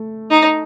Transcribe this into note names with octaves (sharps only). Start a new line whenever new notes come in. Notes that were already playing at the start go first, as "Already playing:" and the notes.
Already playing: A3
D#4